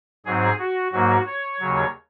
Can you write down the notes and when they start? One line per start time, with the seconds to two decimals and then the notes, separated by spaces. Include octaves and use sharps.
0.26 G#2 F#3 C4 G#4
0.59 F#4
0.92 G#2 F#3 A#3 F#4
1.27 C#5
1.60 D#2 C#3 F#3